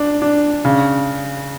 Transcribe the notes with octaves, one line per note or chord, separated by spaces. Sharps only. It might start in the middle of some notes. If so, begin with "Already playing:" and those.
Already playing: D4
D4
C#3